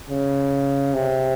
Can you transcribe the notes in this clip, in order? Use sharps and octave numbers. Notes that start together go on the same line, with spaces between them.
C#3
C3